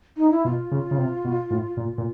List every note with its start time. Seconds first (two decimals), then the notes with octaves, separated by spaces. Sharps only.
0.17 D#4
0.30 E4
0.45 B2 F4
0.71 C#3
0.91 C#3
0.98 C3
1.25 B2
1.50 A2
1.77 A#2
1.98 A#2